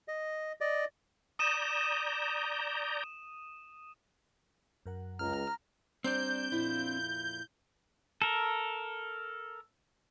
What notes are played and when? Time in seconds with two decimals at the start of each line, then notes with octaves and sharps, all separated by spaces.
0.08 D#5
0.61 D5 D#5
1.39 D5 A#5 D#6 G6 D#7 E7
4.86 F#2 A#4 F#5
5.19 C#2 A#5 F6
6.04 G3 C4 D4 C5 A#5 G6
6.52 F2 A#2 E4
8.22 A4 A#4